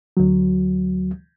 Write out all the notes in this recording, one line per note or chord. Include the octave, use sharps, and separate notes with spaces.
D2 F#3